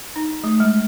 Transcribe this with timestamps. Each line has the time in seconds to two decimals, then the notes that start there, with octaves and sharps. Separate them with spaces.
0.16 D#4
0.44 A3
0.60 G#3